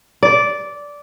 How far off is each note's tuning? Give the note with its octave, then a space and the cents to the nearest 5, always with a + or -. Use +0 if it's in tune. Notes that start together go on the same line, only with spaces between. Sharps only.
D5 -10